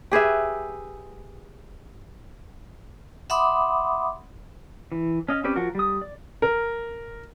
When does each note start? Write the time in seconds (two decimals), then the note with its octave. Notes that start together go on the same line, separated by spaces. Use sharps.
0.12 G4 G#4 B4 E5
3.30 E5 F#5 B5 C6 D6 D#6
4.92 E3
5.28 C#4 D#5 F5
5.44 C4 C#4 G4 B4 D5
5.56 F3 F4 F#4 A#4
5.75 G3 D#6
6.01 D5
6.42 A#4